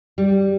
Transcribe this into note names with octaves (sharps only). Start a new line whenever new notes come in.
G3